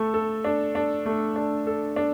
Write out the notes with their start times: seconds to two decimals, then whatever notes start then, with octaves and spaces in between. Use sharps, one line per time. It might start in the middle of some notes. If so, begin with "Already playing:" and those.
Already playing: A3 A4
0.14 A4
0.44 D4
0.75 D4
1.06 A3
1.36 D4
1.67 A4
1.96 D4